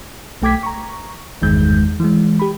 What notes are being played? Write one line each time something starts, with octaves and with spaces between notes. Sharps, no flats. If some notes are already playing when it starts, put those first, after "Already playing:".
B1 A3 G5 D6 G#6 B6
A#5 C#6
G#1 E2 G2 D#3 G#3 G6
E3 G#3
G4 B5